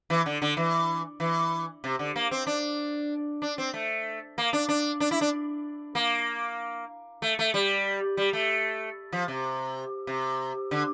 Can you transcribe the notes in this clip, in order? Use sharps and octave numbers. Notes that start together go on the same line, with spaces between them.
E3
D3
D3
E3
E3
C3
D3
A#3
C4
D4
D4
C4
A3
A#3
D4
D4
D4
E4
D4
A#3
A3
A3
G3
G3
A3
F3
C3
C3
D3